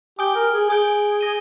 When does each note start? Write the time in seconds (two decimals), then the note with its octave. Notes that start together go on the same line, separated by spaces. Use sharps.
0.19 G4 G#5 D#6 G6 D7 G7
0.35 A#4
0.53 G#4
0.69 G#4 G#5 D#6 G6 D7 G7
1.20 D#6 A#6 D#7 G7